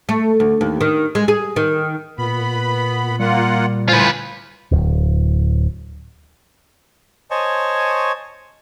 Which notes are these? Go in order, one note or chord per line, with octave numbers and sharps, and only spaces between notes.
A3
D2
D#2
D#3
G#3
G#4
D#3
A#2 B3 B5
G3 A#3 F4 F#5
A2 F4 B4 C5 G#5
D1
C5 C#5 D#5 G#5 A5 C#6